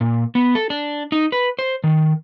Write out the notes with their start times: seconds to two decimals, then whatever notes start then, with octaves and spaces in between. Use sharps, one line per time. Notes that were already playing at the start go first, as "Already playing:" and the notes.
0.01 A#2
0.35 B3
0.55 A4
0.70 D4
1.12 D#4
1.32 B4
1.59 C5
1.84 D#3